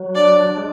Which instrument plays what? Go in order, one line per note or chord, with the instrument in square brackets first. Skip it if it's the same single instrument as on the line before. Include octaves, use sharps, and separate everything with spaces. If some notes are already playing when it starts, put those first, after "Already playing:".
Already playing: [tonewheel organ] F#3
[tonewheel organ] D4 [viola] D5
[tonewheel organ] G#3